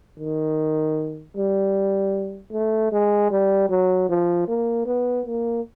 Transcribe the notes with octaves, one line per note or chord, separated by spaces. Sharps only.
D#3
G3
A3
G#3
G3
F#3
F3
A#3
B3
A#3